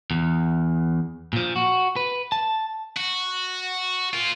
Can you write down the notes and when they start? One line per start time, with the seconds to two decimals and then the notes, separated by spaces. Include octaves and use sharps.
0.11 E2
1.33 A#2 F3
1.56 F#4
1.96 B4
2.32 A5
2.96 F#4
4.13 F4 A#4